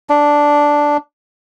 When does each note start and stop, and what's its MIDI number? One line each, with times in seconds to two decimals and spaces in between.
0.09 0.97 62